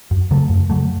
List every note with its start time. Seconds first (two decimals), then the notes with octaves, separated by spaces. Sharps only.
0.11 F#2
0.31 C#3 F#3 A3
0.50 F#2
0.70 C#3 F#3 A3